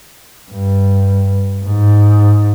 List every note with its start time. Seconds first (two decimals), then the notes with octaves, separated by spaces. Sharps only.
0.51 G2
1.65 G#2